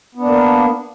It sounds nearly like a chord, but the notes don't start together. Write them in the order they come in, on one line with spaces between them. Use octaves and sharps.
B3 D4 A#3